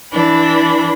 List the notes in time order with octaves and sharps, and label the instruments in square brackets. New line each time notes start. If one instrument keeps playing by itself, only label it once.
[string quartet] E3 D4 B5